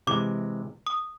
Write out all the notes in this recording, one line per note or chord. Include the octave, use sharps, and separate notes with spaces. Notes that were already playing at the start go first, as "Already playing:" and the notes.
C3 E3 G#3 D6
D#6